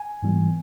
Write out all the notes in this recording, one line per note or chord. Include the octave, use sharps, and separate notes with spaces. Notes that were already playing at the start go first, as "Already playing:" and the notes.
Already playing: G#5
G#2 E3 G3 B3